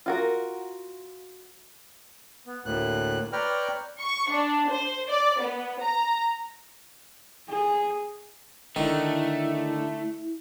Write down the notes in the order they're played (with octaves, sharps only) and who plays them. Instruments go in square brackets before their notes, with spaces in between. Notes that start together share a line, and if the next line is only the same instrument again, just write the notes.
[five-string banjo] F4 F#4 A#4
[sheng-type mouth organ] B3
[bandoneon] D2 A2 F#6 [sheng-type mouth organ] A#3
[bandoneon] B4 G5 F6 [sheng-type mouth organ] C#5 D5 A#5
[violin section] C#6
D4
C5
D5
B3
A#5
[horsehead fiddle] G#4
[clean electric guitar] D3 [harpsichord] D#3 [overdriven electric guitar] A3 [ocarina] E4